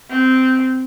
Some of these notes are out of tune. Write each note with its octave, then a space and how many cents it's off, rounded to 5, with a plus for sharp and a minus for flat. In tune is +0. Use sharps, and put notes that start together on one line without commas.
C4 -15